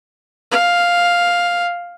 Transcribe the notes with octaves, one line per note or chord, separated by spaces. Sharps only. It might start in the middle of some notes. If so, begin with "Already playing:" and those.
F5